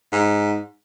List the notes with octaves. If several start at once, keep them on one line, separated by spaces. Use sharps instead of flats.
G#2